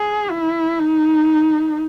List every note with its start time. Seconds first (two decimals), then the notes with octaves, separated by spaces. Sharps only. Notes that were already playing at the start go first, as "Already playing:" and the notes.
Already playing: G#4
0.31 E4
0.79 D#4